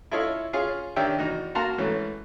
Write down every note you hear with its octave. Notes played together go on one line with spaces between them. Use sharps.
E4 F4 A4 C#5 D#5 F5
C#4 F4 G#4 F5
D#3 C#4 D4 G4 E5 G5
E2 D#4 F#4
A#3 F#4 F5 A5 A#5 C6
G#2 E3 A3 C#4